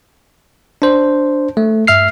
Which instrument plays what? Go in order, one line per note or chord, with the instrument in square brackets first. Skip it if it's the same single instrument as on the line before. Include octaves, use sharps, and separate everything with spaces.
[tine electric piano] D4 C5
A3
G2 E5 F6 C7